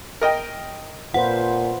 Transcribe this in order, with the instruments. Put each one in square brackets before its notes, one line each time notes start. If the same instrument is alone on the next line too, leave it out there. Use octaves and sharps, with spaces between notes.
[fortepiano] A#4 D#5 G5
[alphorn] A#2 [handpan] F4 B4 C5 [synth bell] F#5